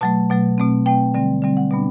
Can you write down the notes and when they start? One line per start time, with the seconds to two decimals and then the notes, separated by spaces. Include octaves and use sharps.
0.01 B2 F#3 A3 A5
0.30 B2 F#3 A3
0.58 B2 A3 C4
0.86 B2 A3 C4 G5
1.14 D3 G3 C4
1.42 D3 G3 C4
1.57 F#5
1.71 B2 G3 B3 D4